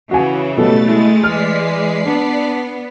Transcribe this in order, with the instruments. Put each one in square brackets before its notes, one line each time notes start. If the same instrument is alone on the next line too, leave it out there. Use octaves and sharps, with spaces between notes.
[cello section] C#3 E3 [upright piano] F#4 G#5
[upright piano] B2 G3 [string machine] A3 A6 [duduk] A4
[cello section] G#3 [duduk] E4
[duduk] E3 [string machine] D5 B6 C7 [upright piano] F6
[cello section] B3 [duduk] D4